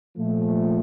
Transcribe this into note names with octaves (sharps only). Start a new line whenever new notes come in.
A#2 F3 A3